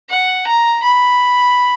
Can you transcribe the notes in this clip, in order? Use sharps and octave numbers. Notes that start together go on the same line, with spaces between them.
F#5
A#5
B5